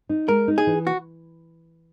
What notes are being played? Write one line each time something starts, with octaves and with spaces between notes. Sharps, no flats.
D#4
G#3 A#4
D#4
G#4
E3
F#4